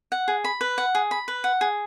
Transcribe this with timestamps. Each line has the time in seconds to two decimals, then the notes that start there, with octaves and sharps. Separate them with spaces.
0.12 F#5
0.28 G#4
0.44 B5
0.61 B4
0.78 F#5
0.95 G#4
1.11 B5
1.28 B4
1.44 F#5
1.61 G#4